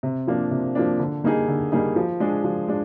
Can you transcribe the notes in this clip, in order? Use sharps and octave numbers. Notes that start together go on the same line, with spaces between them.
C3
F3 A#3 D4
C3
F3 A#3 D4
D3
G3 A#3 D#4 G#4
D3
G3 A#3 D#4 G#4
F3
G#3 D4 G#4
F3
G#3 D4